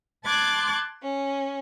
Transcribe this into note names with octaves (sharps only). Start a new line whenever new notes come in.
A5 C6 D6 F#6 G#6 A6
C#4